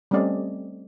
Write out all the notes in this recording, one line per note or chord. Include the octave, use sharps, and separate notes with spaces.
G3 A3 C4 C#4 D5 D#5